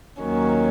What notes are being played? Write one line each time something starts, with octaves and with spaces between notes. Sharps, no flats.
D#2 D#3 F#3 C#4